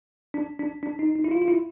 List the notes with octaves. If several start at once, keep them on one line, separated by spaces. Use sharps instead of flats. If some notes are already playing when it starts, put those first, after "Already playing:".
D4
D4
D4
D#4
D#4
E4
F4
F4
E4